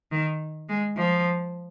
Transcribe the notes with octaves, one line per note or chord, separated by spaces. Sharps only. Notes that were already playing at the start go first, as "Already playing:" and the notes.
D#3
G#3
F3